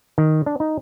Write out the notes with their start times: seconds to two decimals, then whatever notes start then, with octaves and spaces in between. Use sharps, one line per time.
0.18 D#3
0.46 D4
0.60 D#4